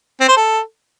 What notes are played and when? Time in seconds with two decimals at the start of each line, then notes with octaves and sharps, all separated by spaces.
0.21 C4
0.29 C5
0.37 A4